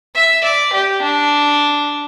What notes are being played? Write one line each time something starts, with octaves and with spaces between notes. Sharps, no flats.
E5
D5
G4
D4